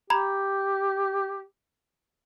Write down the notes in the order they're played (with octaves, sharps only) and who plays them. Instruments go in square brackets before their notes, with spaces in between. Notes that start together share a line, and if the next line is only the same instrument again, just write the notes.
[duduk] G4 [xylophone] A#5 B5 G#6